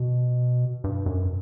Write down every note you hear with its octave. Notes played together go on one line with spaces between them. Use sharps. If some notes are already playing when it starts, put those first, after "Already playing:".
Already playing: B2
G2
F#2